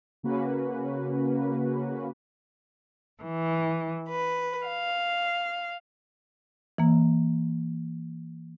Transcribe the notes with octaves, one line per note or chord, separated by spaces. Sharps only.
C#3 A#3 C#4 F#4 B4
E3
B4
F5
E3 A#3